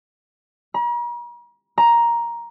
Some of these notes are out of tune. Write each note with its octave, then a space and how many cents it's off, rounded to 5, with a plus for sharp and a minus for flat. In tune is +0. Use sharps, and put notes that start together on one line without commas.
A#5 +45
A#5 +10